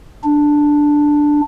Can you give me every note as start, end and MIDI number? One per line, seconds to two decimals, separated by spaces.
0.24 1.41 62